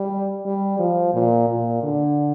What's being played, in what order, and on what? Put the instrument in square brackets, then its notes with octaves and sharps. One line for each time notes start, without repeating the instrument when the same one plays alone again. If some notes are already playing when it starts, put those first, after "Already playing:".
Already playing: [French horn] G3
G3
F3
A#2
A#2
D3